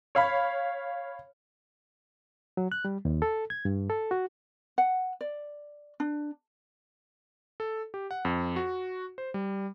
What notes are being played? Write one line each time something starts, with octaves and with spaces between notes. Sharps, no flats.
C#5 F5 B5
F#3
F#6
G3
D#2
A4
G#6
G2
A4
F#4
F#5
D5
D4
A4
G4
F#5
F2
F#4
C5
G3